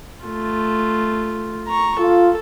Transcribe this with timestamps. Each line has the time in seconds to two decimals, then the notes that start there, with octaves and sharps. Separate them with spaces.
0.25 A3 F4
1.67 A#5 C#6
1.99 F4 A4